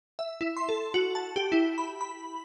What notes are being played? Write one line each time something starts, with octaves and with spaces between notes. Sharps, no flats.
E5
E4
C6
A4
F#4
A5
G4
E4
B5
B5